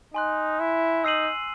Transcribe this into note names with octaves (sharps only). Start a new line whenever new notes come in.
D#4 G#5 C6 F#6
E4
D#4 E6 C7 D#7 F#7